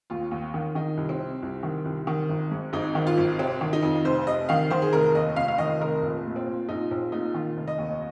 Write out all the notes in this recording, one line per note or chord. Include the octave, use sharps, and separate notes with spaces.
D#2 F4
D#2
D#3
D#3 D#4
C2
C4
C3
C2
D#3
C2
D#3
G#1
G#2
G#1 D#4
D#3
F4
G#1
C3 C4
D#3
D#4
F2
F1 C5
C3 D#5
D#3 F5
D#3 C5
G#4
F1 A#4
D#2 D#5
F1 F5
F5
D#3 D#5
F1 A#4
A#1
A#2
C4
A#2
A#1 D#4
A#1 C4
A#2 D#4
D#3 F4
F1
D#5
D#2